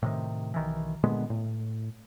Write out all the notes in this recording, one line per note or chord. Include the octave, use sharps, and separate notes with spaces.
A2 C3 D#3
B1 D#3 E3
A#2 D3 G#3 B3
A2